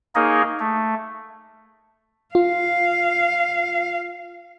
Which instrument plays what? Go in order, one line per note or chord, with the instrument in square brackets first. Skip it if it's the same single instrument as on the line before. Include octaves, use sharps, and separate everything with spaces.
[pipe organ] A#3 D#4 G#4 A#4 C#5 D#5
A3
[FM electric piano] F4 [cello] F5